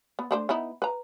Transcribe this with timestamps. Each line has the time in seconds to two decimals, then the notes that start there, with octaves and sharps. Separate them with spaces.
0.19 B3
0.31 A3 D4 C5
0.49 B3 D#4 E4
0.82 B4 A#5